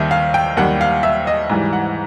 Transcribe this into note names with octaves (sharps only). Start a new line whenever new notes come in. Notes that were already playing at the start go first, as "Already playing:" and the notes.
Already playing: D#2 D#3 G3 E5
F5
G5
D#2 D#3 G3 F#5
F5
E5
D#5
G#2 E3 G3
F#5